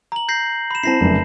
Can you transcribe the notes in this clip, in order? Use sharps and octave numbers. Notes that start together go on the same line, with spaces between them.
A#5 F#7
G6 A#6 C7
B5 E7
C4 E4 A5 A#6 C7
F1 F#2 C#3